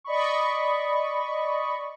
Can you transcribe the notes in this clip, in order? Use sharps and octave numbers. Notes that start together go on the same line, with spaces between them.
D5 D#5 B5 C#6